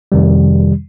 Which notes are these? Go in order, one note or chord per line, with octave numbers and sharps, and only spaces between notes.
F2 C3 D#3 G3